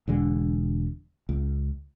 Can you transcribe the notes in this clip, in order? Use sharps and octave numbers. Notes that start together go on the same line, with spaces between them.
E1 D3 G#3
C#2